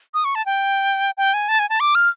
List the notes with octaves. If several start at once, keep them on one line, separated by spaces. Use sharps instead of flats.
D#6
C#6
A5
G5
G5
G#5
A5
G#5
A5
D6
F6